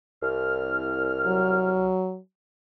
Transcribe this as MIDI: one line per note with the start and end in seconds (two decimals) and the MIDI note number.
0.23 1.93 36
0.23 1.93 89
1.27 2.19 54